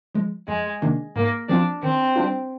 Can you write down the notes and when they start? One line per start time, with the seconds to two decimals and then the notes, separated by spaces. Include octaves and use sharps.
0.15 F3 G#3
0.48 F2 G#3
0.82 C3 D#3 A#3 D4
1.16 G#2 A#3
1.49 F3 C4 D4 F4
1.83 D#3 C4
2.16 G3 D4 F4